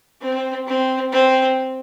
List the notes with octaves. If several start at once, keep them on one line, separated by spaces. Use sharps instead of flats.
C4
C4
C4